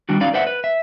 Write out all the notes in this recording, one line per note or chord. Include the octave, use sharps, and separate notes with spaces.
D#3 G3 D4 F#4
C#4 D#4 F#4 D5 F5
B4 C5 D5 E5 F#5
B4
E5